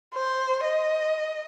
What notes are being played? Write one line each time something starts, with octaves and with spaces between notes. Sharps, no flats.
C5
D#5